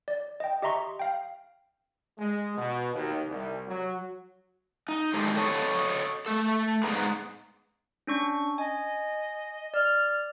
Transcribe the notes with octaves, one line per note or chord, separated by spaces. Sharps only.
D5
D#5 G5
G4 D#5 E5 A#5 C6 C#6
F5 G5
G#3
B2
D#2
C2
F#3
D#4
D#3 G#3 A3 G4 A4 C5
A4 C#5 D#5
A3 A4
G#2 B3 G#4 B4 A#5
C#4 D4 C#6
D#5 G#5
D5 F6